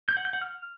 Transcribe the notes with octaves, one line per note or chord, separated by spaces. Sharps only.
G6
F#5
G6
F#5
F6